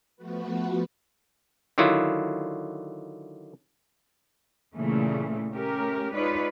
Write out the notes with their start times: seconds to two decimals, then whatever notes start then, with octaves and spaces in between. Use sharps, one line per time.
0.16 F3 A3 B3 F#4 B4
1.78 D3 D#3 F#3 E4 F4
4.76 A#2 C#3 E3 A3
5.52 A3 C#4 G4 A#4
6.14 G#3 D#4 F4 B4 C#5 D5